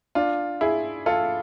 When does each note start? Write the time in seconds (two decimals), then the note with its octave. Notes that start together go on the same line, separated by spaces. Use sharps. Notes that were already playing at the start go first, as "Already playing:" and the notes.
0.15 D4 F4
0.61 E4 G#4
1.06 F4 A4